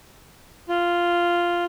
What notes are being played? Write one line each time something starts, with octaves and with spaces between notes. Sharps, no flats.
F4